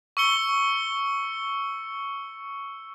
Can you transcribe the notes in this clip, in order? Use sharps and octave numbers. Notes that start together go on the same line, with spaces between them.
C#6 E6 C#7 G7